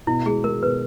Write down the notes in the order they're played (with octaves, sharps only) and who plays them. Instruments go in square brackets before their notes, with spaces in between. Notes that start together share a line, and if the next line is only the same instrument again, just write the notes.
[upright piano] B2 [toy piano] E4
[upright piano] G#3 [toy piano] G#4
[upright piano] G#3 [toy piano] A#4
[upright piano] B2 [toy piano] B4